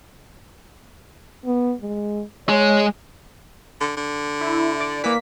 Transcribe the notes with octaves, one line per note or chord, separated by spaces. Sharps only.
B3
G#3
G#3 C#5
D3
D3
E4
D5
E3 A#3 B6